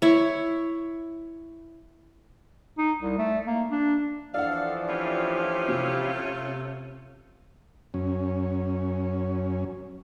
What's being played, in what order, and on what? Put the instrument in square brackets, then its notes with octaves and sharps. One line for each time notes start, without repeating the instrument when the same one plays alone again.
[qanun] E4 C#5
[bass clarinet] D#4
C2
A3
A#3
D4
[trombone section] E3 F3 [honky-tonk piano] D4 F#5 [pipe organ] A4 [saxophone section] F5
[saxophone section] A3 C#4 F4 [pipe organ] E4 G4 F5
[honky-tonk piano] C3
[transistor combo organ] F#2 C#4